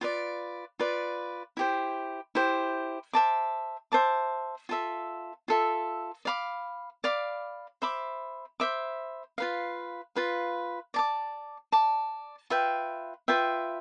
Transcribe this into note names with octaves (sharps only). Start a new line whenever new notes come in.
F4 B4 D5
F4 B4 D5
E4 G4 C5
E4 G4 C5
C5 E5 A5 D6
C5 E5 A5 D6
F4 A4 E5
F4 A4 E5
D5 F5 B5 D6
D5 F5 B5 D6
C5 E5 B5 D6
C5 E5 B5 D6
F4 B4 F5
F4 B4 F5
D5 A5 D6
D5 A5 D6
F4 B4 E5 G5
F4 B4 E5 G5